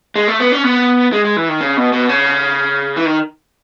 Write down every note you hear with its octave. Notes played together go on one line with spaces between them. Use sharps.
G#3
A3
B3
C#4
B3
G#3
G#3
E3
D#3
C#3
B2
B2
C#3
E3
D#3